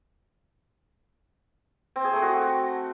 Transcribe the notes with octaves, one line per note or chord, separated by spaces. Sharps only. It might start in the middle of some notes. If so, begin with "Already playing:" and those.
C4
G#4
A3
F#4